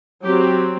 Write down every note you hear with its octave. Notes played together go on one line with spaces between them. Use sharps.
F#3 C4 G4